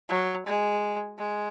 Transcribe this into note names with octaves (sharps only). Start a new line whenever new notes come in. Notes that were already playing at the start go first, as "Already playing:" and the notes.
F#3
G#3
G#3